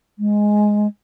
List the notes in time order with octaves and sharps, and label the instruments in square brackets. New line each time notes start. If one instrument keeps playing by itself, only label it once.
[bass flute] G#3